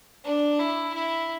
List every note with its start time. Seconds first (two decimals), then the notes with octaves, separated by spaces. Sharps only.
0.24 D4
0.59 E4
0.94 E4